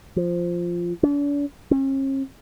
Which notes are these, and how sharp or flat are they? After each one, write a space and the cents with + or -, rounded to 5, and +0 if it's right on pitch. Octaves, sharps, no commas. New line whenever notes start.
F3 -5
D4 -40
C#4 -45